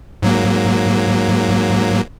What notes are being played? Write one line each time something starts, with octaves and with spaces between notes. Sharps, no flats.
G#2 F#3 A#3